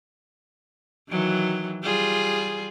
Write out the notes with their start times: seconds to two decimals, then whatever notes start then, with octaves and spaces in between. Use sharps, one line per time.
1.09 D#3 E3 F#3
1.83 G3 F4 G#4